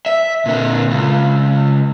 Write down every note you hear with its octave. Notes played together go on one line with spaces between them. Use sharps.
E5
A#2 D3
C#2